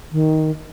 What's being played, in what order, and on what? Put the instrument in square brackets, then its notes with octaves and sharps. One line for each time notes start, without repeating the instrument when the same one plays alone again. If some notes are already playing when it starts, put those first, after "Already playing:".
[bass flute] D#3